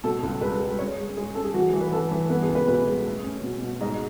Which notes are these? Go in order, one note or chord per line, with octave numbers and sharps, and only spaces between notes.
B2 A4
C#2
G#3 B4
G#3
C#4 C#5
G#3
G#3 G#4
C#4 A4
G#4
E3 F#4
E3
B4
E3 A4
E3
B3 B4
G#4
C#2
B4
B2 B4
G#3
A3
C#4
B2
B2
G#2 D#5